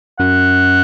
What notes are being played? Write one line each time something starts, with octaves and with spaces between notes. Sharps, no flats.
F#2 F#5